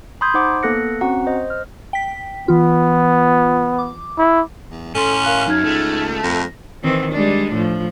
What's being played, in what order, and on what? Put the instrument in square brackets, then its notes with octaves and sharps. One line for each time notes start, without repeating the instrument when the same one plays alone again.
[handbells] B5 C6 D#6 G6 G#6
D#4 C5 F#5 D6
A#3 B3 A4 F#6 A#6 C#7
C4 C#4 F#4 F#5 A#5
C5 D#5
F6
[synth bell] G5 B6
[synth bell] E3 F4 [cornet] B3
[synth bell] D6
[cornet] E4
[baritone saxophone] E2
[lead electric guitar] A2 C6 [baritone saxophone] C#4 [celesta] A4
[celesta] A#4 F5 F#6
[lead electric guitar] F#2 [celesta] D#4 F6 G#6
[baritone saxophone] C#2 [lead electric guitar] A3
[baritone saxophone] F2 [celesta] A#6
[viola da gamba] D#3 E3 C4
G3 G#3 D4
A2 F3